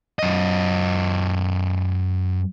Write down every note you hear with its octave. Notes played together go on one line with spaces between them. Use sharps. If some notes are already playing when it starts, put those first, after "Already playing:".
F#2 D#5